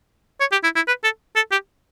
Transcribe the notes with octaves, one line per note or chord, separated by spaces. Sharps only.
C#5
G4
E4
E4
B4
A4
A4
G4